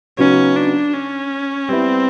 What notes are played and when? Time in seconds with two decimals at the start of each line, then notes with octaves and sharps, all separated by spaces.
0.18 C#3 F#3 B3 C#4 D#4
0.56 D4
0.93 C#4
1.68 G3 B3 C4 E4